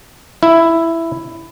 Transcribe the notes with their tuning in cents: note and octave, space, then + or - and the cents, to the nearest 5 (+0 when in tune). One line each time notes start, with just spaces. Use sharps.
E4 +5